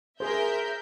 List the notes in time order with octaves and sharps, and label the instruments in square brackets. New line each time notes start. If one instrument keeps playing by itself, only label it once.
[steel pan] G#4 C5 [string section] A#4 E5 G6